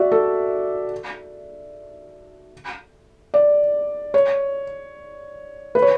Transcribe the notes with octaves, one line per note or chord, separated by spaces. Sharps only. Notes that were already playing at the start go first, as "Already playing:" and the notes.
Already playing: F#4 D5 E5
A4
D5
C#5
B4
C#5